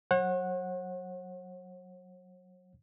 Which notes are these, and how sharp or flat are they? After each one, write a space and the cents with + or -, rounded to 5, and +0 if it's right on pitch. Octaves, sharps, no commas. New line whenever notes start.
F#3 +0 C#5 -45 F#5 -10